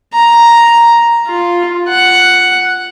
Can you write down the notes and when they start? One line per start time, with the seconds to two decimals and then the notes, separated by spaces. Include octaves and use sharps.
0.14 A#5
1.27 F4
1.89 F#5